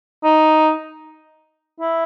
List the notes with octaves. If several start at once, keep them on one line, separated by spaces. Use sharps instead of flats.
D#4
E4